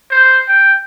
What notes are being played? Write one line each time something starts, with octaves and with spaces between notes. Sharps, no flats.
C5
G5